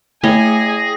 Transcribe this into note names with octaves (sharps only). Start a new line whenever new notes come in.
A3 E4 G#4 C#5 D#5 G5 G#5 A#6